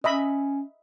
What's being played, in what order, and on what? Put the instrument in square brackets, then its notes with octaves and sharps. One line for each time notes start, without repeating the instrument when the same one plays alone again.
[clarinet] C#4 [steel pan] D#5 E5 B5